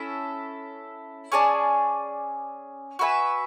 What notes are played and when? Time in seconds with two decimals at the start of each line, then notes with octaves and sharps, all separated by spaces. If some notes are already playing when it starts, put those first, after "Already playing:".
Already playing: C#4 E4 A4 E5
1.32 C#4 G#4 D5 A5
2.99 F#4 B4 E5 G#5